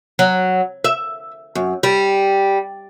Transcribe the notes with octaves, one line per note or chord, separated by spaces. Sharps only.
F#3
E5
F#2
G3